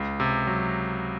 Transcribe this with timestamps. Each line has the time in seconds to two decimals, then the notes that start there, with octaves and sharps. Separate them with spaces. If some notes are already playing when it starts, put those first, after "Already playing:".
Already playing: C#2
0.20 C3
0.47 F#3